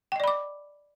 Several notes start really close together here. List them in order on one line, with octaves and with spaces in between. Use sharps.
G5 D#5 D5 B5 D6